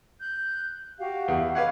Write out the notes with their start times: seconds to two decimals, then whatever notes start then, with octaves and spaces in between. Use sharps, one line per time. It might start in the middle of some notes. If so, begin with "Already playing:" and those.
0.20 F#6 G6
0.99 F#4 G4 F5
1.28 E2
1.55 B4 F5 F#5 C#6 D6 G#6